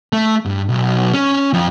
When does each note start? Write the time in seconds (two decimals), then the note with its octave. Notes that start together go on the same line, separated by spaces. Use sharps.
0.13 A3
0.45 G2
0.69 B1
1.13 C#4
1.53 F2 F3